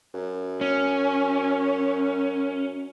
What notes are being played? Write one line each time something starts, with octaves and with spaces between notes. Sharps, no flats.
F#2
C#4